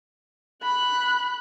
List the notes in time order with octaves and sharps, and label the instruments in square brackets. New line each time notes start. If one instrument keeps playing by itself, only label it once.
[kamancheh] B5 F#6